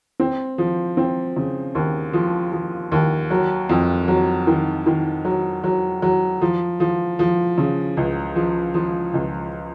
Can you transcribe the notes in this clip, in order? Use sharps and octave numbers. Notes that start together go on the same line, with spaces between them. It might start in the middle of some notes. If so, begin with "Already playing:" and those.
C4
F3
C4
C#3
D#2
F3
F3
D#2
F#3
F2
F#3
D#3
D#3
F#3
F#3
F#3
F3
F3
F3
C#3
C#2
F3
F3
C#2